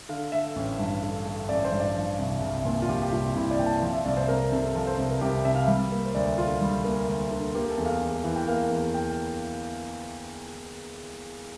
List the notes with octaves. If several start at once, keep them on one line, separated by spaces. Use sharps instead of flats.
D3 F5
A3 E5
A1
G2
D3
A3
A1 D5
C5
G2
D5
F3
C2
C2
A#2
F4
F3 G4
G4
C2 F4
C2 E4
D5
A#2 G5
A5
F3
E5
C2 D5
C5
C2 A#4
C3 A4
A4
F3 A4
C5
C2 C5
A#4
C2 G4
C3 E5
F5
G3 E5
A#3
C5
D2 D5
D3 F4
G3
A#3
D2
D3
A#3 G4
A4
E2
F5
E2
E3
G5
A#3 F5
E2
G5